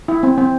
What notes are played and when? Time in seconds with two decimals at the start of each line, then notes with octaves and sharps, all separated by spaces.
0.08 E4
0.23 C4
0.38 C4